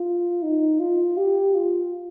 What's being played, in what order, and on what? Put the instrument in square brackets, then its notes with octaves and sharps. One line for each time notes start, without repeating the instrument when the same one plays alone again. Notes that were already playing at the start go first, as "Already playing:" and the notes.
Already playing: [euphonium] F4
D#4
F4
G4
F4